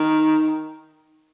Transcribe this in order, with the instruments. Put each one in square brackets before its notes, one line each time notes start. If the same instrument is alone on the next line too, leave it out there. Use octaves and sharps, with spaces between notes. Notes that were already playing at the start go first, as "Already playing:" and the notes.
Already playing: [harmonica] D#3